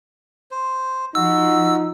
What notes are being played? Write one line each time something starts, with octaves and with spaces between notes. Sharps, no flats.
C5
F3 D#4 F#4 E6